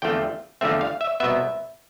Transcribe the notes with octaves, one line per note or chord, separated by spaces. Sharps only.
E2 D3 F3 A3 C4 G5
E2 D3 F3 A3 C4 E5
F5
E5
C2 B2 B3 E5